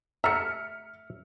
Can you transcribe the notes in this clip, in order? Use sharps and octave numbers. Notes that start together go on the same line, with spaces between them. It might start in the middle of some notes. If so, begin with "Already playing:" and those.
A3 E5 A#5 F6 C#7